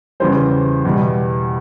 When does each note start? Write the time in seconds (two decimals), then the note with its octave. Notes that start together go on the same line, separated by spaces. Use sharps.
0.20 E2 C#3 E3 G3 C5
0.85 E2 B2 G3